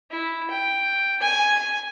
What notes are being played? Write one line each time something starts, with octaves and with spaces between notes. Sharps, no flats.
E4
G5
G#5